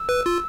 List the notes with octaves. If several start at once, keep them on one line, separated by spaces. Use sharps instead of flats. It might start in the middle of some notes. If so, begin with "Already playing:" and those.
Already playing: E6
B4
F4